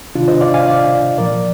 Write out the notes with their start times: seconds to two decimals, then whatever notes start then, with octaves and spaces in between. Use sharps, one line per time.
0.15 C3 D#3 D4 F4
0.28 C5 D#5
0.41 D5 F5
0.54 F5 G#5
0.67 D5 F5
1.18 A#2 F3 A#4 D5